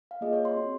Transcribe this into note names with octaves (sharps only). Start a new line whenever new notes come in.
F5
A#3 F4 G#4 D#5
C#5
C6
C4 F#4